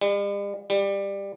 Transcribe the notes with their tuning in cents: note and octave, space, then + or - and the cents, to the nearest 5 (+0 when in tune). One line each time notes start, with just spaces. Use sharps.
G3 +45
G3 +15